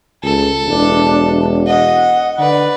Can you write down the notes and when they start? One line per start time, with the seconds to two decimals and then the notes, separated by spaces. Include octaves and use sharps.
0.23 C#2 A4
0.66 E1 D4
1.67 D#5 F#5
2.39 D3 B4 D5